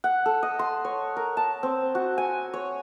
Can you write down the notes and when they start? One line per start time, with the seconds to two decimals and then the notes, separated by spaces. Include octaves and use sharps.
0.04 F#5
0.26 A4
0.43 D#5
0.59 C6
0.85 C#5
1.17 A#4
1.37 A5
1.63 C4
1.95 F#4
2.18 G#5
2.54 C#5